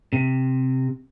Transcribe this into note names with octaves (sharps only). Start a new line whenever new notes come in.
C3